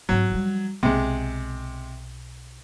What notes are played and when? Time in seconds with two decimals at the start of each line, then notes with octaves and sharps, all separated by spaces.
0.09 G#2 F#3 C4
0.30 F3 G3
0.83 B1 C3 G#3